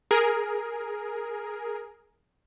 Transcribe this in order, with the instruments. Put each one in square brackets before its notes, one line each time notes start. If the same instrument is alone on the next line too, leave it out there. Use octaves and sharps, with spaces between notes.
[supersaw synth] G#4 A#4